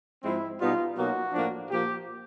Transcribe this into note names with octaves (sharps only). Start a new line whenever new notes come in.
G#2 F3 G#3 C4 E4
B2 G3 B3 D#4 F4
B2 F#3 A#3 D#4 F#4
A2 F3 A#3 D4
A#2 F3 A#3 G4